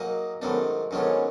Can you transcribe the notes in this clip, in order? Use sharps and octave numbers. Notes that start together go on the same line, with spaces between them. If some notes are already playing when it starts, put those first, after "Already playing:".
Already playing: F#3 A#3 D#4 G#4
G#2 D#3 F#3 A3 B3 C#4 D4
G#2 D#3 F#3 A3 B3 C#4 D4